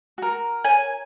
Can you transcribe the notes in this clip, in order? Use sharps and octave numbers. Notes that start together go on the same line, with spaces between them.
F#4 A#4
C#5 G#5